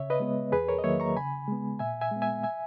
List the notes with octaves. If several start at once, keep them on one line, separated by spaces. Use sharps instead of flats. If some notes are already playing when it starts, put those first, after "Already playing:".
Already playing: C#3 C#5 E5
B4 D#5
G#3 B3
E2 G#4 B4
A#4 C#5
D#5
D#3 F#3 A#3 C#5 E5
A#5 C#6
C#3 G#5 B5
G#3 B3
A#2 E5 G#5
E5 G#5
G#3 B3
E5 G#5
E5 G#5